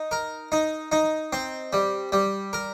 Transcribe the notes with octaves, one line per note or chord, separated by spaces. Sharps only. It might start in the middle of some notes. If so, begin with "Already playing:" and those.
Already playing: D#4
A#4
D#4
D#4
C4
G3
G3
A#4